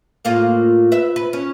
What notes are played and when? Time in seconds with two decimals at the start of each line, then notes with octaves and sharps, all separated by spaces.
0.25 A2 A#3 F4
0.92 B4 E5
1.16 B4
1.33 C#4